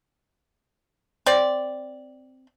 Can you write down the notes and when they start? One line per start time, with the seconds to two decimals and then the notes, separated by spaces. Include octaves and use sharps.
1.26 C4 D5